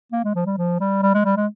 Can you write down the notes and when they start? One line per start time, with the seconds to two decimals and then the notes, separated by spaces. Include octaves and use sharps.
0.12 A#3
0.24 G#3
0.35 F3
0.46 G3
0.58 F3
0.80 G3
1.03 G3
1.14 G#3
1.25 G3
1.36 G#3